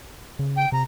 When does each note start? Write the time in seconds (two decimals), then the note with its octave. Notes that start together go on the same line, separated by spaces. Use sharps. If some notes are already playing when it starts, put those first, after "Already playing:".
0.39 C#3
0.56 G5
0.72 C3 A#5